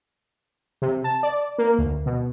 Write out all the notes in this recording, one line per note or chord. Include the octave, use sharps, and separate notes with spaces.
C3
A5
D5
A#3
D2
B2